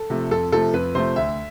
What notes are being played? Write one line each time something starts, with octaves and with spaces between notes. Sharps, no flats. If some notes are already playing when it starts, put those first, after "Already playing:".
Already playing: A4
C3 F3 A3
F2 A4
C3 F3 A3 A4
F2 B4
C3 F3 A3 C5
D2 E5